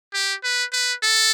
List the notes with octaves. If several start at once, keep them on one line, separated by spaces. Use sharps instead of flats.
G4
B4
B4
A4